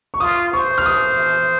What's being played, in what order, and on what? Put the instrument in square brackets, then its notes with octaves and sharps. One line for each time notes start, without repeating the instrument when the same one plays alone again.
[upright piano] C#6
[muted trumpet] F4 [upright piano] D#6
[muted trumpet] C5 [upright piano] C#6
[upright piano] F6
D#6